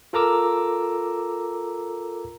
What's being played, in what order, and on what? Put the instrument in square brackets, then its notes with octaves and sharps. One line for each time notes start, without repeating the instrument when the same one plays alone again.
[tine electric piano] F4 A4 A#4 A#5 D6 E6